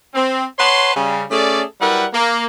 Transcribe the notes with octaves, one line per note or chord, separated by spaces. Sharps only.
C4
B4 C#5 F#5 A5 C6
C#3 G3
A3 C#4 G#4 A4 D5
F#3 G3 E4 A#4 B4 F#5
A#3